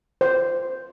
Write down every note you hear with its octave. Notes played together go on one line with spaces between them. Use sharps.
C5